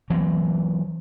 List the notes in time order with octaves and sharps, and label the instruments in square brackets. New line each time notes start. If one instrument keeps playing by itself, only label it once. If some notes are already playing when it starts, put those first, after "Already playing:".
[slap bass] E3 F#3 A#3 C4